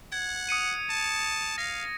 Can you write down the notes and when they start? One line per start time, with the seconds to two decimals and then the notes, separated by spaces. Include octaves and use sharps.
0.12 F#5 G#6
0.49 D#6 C#7 D#7
0.90 A5
1.58 F5 A#6